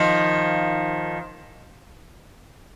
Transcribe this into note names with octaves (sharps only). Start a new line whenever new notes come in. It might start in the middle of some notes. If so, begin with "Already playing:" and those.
Already playing: D#3 F3